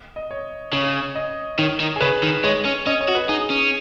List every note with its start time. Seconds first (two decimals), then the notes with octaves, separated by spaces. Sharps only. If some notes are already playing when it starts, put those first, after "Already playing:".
0.16 D#5
0.31 C#5
0.73 C#3 C#5
1.15 D#5
1.59 D#3 C#5
1.80 D#3
1.96 G#4
2.01 C#3 B4
2.23 D#3
2.44 G#3 C#5
2.65 C#4
2.86 C#4 D#5
3.01 C#5
3.08 F#4
3.15 B4
3.29 D#4 G#4
3.50 C#4